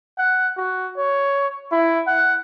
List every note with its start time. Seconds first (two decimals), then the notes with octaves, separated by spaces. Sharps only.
0.18 F#5
0.57 F#4
0.97 C#5
1.72 E4
2.07 F#5